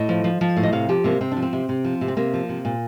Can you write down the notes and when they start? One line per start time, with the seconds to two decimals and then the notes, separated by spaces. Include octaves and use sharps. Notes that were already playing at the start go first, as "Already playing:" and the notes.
Already playing: A2 D#5
0.09 F3
0.24 F3
0.41 F3
0.57 A2
0.63 D#5
0.73 C3 F5
0.89 F3 G4
1.04 C3 A#3
1.21 C3 C4
1.32 D4
1.37 F3
1.42 C4
1.53 C3
1.69 C3
1.85 F3
2.01 C3
2.08 C4
2.17 C3 A#3
2.34 F3
2.49 C3
2.65 A#2